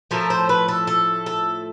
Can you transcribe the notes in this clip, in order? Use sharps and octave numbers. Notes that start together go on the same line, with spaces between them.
A2 F3 A3 A#4
C5
B4
A4
A4
A4